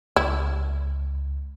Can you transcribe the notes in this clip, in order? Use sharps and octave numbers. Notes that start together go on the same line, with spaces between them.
C#2 E4